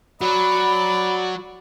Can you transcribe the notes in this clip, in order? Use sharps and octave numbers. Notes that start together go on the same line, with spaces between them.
F#3 D5 B5